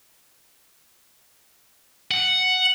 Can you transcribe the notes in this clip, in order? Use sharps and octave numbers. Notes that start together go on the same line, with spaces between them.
F#5